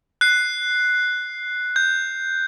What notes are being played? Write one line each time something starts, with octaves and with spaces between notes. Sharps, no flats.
F#6 C7
G6